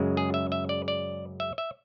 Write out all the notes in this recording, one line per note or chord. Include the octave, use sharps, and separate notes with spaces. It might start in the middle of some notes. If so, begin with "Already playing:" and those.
Already playing: F#2 C#3 G#3
G#4
E5
E5
D5
D5
E5
E5